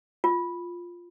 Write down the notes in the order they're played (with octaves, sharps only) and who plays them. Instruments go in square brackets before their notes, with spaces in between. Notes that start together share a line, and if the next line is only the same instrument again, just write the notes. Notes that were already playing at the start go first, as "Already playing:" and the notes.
[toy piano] F4